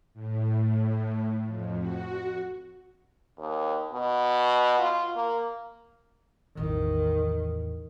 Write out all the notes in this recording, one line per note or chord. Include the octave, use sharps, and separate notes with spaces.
A2
F2
F#4
D#2
B2
F4
A#3
A1 E2 D#3